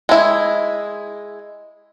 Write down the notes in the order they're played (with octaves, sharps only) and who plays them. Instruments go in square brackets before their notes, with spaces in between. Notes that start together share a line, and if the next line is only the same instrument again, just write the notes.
[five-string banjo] G#3 E4